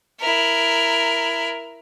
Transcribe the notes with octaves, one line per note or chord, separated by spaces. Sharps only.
E4 A#4